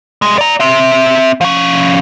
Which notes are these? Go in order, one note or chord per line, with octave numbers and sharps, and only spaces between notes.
C2 G#3
D5 A#5
C4 E5
F3 C#4